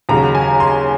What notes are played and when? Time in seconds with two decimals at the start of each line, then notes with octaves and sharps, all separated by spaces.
0.09 D#2 C#3 F#3 A#5
0.35 G#5
0.60 C6